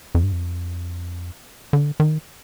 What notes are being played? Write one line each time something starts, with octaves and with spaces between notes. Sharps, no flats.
F2
G2
F2
D3
D#3